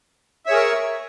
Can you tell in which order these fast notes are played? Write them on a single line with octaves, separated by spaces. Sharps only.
E5 C#5 G#4 A#4 C#6